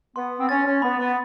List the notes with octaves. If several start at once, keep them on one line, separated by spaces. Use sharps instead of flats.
B3 C6
C4
C#4 A6
C#4
B3 B5
B3